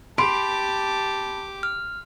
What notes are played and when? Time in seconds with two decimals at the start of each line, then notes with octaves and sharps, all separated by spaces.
0.18 G4 A5 B5 C6 D6 D7
1.63 F6